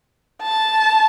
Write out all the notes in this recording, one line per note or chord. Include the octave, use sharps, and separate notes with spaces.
A5